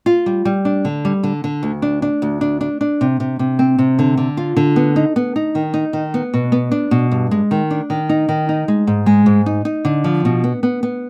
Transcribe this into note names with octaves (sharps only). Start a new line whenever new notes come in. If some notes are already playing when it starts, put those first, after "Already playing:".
F4
G3
G3
D4
D3
G3
D3
D3
D2
D4
D4
D2
D4
D4
D4
C3
C3
C3
C4
C3
D3
D3
F4
D3
B3
D#4
B3
D#4
D#3
D#4
D#3
B3
B2
B3
D4
B2
G2
G#3
D#3
D4
D#3
D#4
D#3
D#4
G#3
G#2
G#3
G#2
D#4
D#4
D3
F3
B2
B3
B3
B3